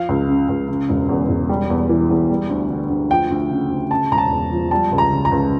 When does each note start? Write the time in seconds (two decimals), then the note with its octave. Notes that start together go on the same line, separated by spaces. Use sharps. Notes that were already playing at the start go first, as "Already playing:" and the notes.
Already playing: F3 F5
0.09 C#2
0.29 C#3
0.49 C#2
0.68 C#3
0.89 E1
1.09 E2
1.29 E1
1.49 G3
1.70 E2
1.89 E3
2.10 E2
2.30 G3
2.49 D2
2.69 D3
2.90 D2
3.10 F3 G5
3.30 D2
3.51 C#3
3.71 D2
3.90 C#3 A5
4.11 E1 A#5
4.18 A5
4.31 E2
4.52 F3
4.71 G3 A5
4.92 C#2
4.98 A#5
5.11 C#3
5.25 A#5
5.32 C#2